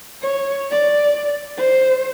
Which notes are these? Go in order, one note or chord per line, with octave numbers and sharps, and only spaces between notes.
C#5
D5
C5